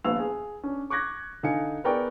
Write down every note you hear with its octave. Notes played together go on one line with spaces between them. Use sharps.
D#1 A#1 B3 F5 E6 F7
G#4
C#4 D4
C#6 D6 F#6 G#6 A#6
D3 D#4 F5 G#5 C#7
B3 G#4 A#4 D5 G5 C#6